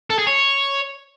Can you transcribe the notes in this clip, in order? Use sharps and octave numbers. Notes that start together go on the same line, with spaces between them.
A4
G#4
C#5